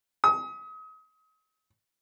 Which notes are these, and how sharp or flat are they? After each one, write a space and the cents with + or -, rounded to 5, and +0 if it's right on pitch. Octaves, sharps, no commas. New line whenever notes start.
D#6 +35